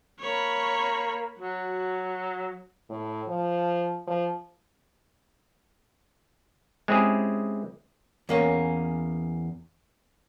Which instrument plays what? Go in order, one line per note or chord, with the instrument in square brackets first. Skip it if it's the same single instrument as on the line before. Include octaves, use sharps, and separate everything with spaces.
[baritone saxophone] A#3 [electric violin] C#5 B5
[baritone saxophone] F#3 [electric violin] F#4
[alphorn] A2
F3
F3
[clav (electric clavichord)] G#3 C4 C#4 E4 G4 G#4
[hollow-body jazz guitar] E2 A#3 C#4